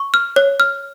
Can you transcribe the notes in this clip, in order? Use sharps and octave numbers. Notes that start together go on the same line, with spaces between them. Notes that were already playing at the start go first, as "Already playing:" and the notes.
Already playing: C#6
F6
C#5
F6